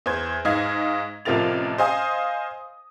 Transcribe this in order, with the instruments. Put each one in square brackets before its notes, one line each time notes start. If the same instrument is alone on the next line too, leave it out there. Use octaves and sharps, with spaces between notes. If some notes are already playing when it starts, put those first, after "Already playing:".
[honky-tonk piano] E2 C5 G#6
G#2 D#5 F5 G#6
A1 C3 F3 A#4 A6 F7
C5 D#5 F5 G#5 D#6